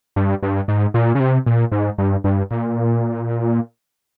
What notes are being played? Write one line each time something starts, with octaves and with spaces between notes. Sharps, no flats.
G2
G2
G#2
A#2
C#3
C3
A#2
G#2
G2
G2
A#2